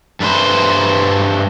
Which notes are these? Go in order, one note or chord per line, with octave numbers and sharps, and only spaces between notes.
G2 A3 B4 C5